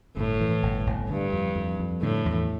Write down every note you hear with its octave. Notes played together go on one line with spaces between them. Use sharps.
G1 A2
E3
G1
G1
G2 D3
F2
F2
F2
A2 D3
E2